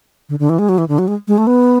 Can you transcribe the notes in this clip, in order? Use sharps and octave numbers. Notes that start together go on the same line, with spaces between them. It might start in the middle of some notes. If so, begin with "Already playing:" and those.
D3
D3
E3
G#3
F#3
E3
D3
F#3
G#3
G#3
A3
B3